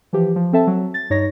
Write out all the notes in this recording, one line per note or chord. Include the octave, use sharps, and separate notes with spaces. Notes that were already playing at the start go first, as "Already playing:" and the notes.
E3 F3 G4
F3
C4 A4 E5 A5
F#3
A6
G2 D#4 C#5 A#6